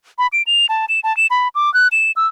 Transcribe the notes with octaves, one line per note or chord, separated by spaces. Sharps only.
B5
D7
F7
A5
E7
A5
E7
B5
D6
F#6
E7
E6